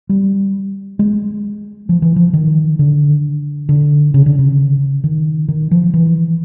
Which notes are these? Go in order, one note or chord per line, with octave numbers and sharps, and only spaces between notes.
G3
G#3
F3
E3
F3
D#3
D3
D3
C#3
D3
C#3
D#3
D#3
F3
E3